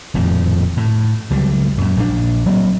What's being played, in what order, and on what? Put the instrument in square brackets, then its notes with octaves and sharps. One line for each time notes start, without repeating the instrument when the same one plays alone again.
[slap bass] D#1 F2 A2 F3
A2
C#2 F#3 G3
F#2 A#2
A#1 A#2 C#3 D4
F#3 A#3 C4